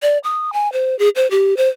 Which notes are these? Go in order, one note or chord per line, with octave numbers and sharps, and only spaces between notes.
D5
D#6
G#5
C5
G#4
C5
G4
C5